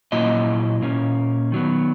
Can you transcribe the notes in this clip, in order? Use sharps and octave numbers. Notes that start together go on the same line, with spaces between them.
A#2 F#3 A#3 E4 D#5
A#2 A#3 C#4
D#3 F#3 B3